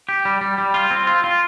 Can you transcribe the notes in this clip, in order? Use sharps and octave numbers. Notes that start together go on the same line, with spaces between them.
G4
G3
G3
G3
F4
C4
F4
F4